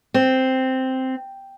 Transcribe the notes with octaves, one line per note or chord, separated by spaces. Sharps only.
C4